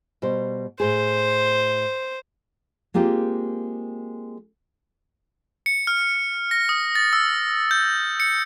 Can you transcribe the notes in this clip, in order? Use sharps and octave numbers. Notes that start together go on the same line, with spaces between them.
B2 G3 C5
A2 G#4 C5
G#3 A#3 C4 F4 G4
C#7
F6
A#6
D#6
A6
E6
G6
C#7